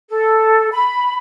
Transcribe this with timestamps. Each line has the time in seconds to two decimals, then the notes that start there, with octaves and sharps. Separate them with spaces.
0.09 A4
0.72 B5